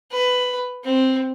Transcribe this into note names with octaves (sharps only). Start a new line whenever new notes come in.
B4
C4